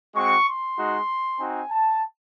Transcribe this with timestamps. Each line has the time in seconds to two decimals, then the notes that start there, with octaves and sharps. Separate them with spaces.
0.15 G#3 C4 F#4 C#6
0.47 C6
0.78 G#3 D#4 F#4
1.39 C4 D#4 F#4 G#5
1.70 A5